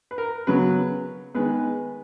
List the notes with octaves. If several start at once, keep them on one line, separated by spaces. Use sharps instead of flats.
B4
A#4
C#3 F#3 B3 B4
D#3 G#3 B3 B4